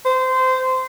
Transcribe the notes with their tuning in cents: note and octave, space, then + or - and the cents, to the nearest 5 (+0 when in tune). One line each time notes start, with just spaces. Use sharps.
C5 -20